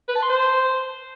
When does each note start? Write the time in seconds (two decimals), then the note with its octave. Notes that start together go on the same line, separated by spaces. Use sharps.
0.08 B4
0.15 A5
0.22 C6
0.29 C5